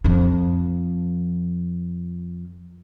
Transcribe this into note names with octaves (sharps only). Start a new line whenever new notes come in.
F2 F3